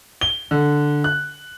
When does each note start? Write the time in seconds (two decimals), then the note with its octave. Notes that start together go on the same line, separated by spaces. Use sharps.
0.21 G7
0.51 D3
1.04 F#6